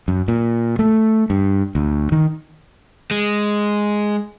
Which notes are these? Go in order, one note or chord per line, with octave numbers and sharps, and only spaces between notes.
F#2
A#2
A3
G2
D2
D#3
G#3